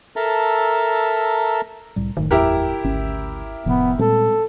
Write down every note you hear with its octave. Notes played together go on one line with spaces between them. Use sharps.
A4 A#4 E5 A5 A#5
C2 A2 G3
F#1 A2 D#3
E2 E4 G4 A#4
G#1 D2 C#4
F1 A2 C3 F3 B3
A#2 G3 G#3 C4 A4